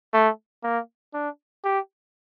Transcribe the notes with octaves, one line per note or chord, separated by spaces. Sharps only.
A3
A#3
D4
G4